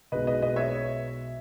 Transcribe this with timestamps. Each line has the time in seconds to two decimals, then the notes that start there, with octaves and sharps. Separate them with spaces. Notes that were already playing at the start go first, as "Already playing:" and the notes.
0.12 B1 B2 G#3 B3 D#4 B4 D#5
0.27 B4 D#5
0.42 B4 D#5
0.56 C#5 E5